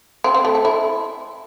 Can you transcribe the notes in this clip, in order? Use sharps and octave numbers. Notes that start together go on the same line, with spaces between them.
C4
C4
A3
A4
E4